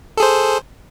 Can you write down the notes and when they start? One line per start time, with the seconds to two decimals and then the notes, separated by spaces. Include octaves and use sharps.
0.17 A4
0.20 G#4
0.23 C5